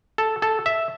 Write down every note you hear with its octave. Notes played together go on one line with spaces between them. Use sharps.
A4
A4
E5